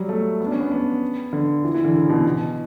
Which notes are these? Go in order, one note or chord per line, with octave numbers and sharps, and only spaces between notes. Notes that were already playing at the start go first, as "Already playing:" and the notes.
Already playing: F#3 G3
A3
B3
D4
C#4
B3
B3
D3
E3
E3
D3
C#3
B2
B2